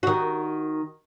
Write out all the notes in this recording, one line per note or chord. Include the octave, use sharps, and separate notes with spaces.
D#3 F#4